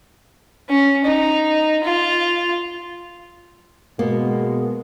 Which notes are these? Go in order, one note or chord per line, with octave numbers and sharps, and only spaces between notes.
C#4
D#4
F4
B2 G#3 A#3 B3